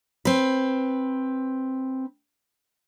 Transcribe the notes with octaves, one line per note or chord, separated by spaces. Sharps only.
C4 B4